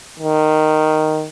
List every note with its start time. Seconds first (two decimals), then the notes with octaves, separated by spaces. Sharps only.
0.20 D#3